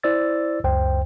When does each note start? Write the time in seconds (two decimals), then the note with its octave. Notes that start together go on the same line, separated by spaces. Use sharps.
0.03 E4 C5 D5 E6 A6
0.64 C#2 F#2 C5 G5